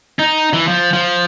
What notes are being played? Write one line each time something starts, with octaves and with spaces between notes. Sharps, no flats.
D#4
E3
F3
F3